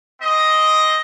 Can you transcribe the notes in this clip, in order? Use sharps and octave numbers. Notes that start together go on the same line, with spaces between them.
C4 D#5